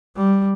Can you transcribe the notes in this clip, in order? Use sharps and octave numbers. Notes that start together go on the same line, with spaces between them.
G3